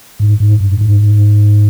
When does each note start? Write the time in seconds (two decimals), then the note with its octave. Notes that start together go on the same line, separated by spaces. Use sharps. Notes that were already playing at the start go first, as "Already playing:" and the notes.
0.20 G#2
0.40 G#2
0.60 G2
0.81 G#2